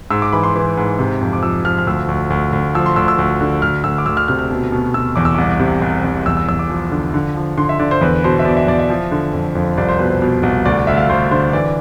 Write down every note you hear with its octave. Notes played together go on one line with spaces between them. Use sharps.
G#2 E6
D6
E3 B5
C6
E3
G#2
C3
F2
D6
F3 E6
F3 F6
F6
D2 E6
D2
D2
D2
F3 E6
C6
D2 E6
E6
D2
D3
D2 F6
D2 E6
D6
D2 E6
F6
C3 F6
F6
B2
B2
B2 E6
E2 D6
E6
C2 D6
C3
C2
C2
E2 E6
E6
E2 E6
D6
F3
D3
D3
F3
D3 C6
E5
D3 D5
C5
E2 B4
B2 C5
E5
B2 D5
E5
E2 D5
E5
F3
D3
F2
F2
C2 D5
C5
B2 B4
C5
B2
C2
D2 D5
D2 E5
F5
D2 C5
D3 C5
E3 D5